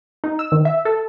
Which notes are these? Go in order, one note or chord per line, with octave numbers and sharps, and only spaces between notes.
D#4
E6
D#3
E5
A4